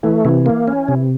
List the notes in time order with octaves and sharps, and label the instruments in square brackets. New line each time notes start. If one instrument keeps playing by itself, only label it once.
[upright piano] E3 [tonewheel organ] A3
[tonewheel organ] C3 [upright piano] E3
[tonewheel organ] A#3
C#4
C3